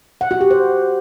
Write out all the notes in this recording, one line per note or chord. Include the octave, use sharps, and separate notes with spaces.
F#5
F#4
G4
C5